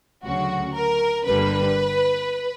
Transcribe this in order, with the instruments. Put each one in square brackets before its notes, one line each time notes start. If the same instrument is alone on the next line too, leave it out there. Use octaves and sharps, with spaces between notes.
[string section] D2 C#3 F#3 F#4
A#4
G1 G2 D3 G3 A#3 B4